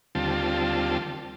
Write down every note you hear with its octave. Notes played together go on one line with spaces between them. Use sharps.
D#2 D3 G3 C4 F4 A5